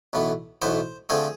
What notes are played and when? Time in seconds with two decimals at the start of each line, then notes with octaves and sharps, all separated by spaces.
0.13 B1 A2 E3 B3
0.62 B1 A2 E3 B3 C5
1.09 D3 F3 A3 C4 G#4